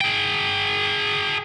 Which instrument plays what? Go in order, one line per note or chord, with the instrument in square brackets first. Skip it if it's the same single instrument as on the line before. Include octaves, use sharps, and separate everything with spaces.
[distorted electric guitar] G#4 G5